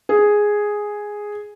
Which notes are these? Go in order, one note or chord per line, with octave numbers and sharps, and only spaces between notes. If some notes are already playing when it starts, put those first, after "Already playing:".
G#4